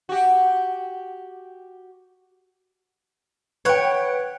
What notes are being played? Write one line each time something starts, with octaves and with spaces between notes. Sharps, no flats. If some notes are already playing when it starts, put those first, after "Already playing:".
F#4 G4
B4 C#5 F#5 G5